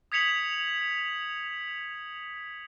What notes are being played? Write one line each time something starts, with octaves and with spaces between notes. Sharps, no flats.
D#6 G#6 B6 C#7 F7 F#7